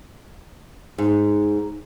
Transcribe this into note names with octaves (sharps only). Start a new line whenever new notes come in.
G#2